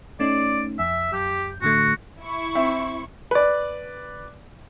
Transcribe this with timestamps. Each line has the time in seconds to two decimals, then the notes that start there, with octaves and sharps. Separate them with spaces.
0.20 A3 C#4 D#4 D5
0.79 F2 E5
1.13 F#2 G4 G6
1.62 A2 D3 A3 F#4
2.21 E4 C#6
2.55 C4 E5
3.31 B4 D5